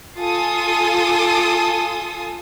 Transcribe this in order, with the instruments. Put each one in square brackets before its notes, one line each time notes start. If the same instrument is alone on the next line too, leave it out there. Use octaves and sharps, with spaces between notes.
[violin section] F4 A4 G#5 D#6